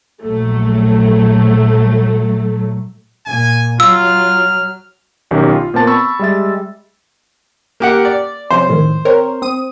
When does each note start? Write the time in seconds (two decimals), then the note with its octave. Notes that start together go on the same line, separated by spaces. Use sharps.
0.23 A#1 F#3 A3
3.26 A#2 G#5
3.80 F#3 F4 E6 F6
5.31 B1 D#3 C#4 G4
5.53 F4
5.74 A#2 B3 C4 A#4 A5 A6
5.87 B5 C#6 E6 A6
6.19 G3 G#3 E5 A6
7.80 A#3 G4 F#5
8.05 D5
8.50 C3 F3 C#4 C5
8.68 F2 A2 D#3
9.05 C4 A#4 C#5
9.42 C4 D#6 D#7